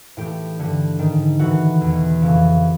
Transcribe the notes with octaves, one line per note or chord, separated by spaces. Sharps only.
A2 E3 G4
G2 D3
G#2 D#3
A2 E3 F#4
E2 B2
F2 C#3 E3